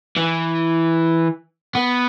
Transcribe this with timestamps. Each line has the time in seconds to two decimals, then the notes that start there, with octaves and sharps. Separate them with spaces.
0.17 E3
1.75 B3